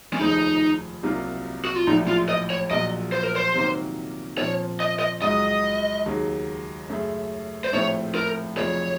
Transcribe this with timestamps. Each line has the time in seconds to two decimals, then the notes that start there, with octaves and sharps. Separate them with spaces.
0.14 C#4
0.19 F1 D#2 C#3 F3 D#4
1.03 C2 C3 F#3 A#3 F4
1.65 F#4
1.76 F4
1.87 A#1 A2 F#3 D#4
2.08 F4
2.29 D#5
2.50 C#5
2.70 A#1 A#2 F#3 D#5
3.12 C5
3.23 A#4
3.35 C5
3.54 C3 D#3 F#3 A#3 C#4
4.38 A#2 F3 C4 C#5
4.80 D#5
4.99 D#5
5.21 C#2 C#3 F#3 D#5
6.06 D#2 C#3 F#3
6.89 F#2 C#3 A3 C#4
7.64 C5
7.73 A#1 A2 A3 C4 C#5
8.15 A#4
8.57 F1 F2 C#3 F#3 C#5